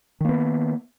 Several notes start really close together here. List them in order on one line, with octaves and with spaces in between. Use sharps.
D#3 A#3 B3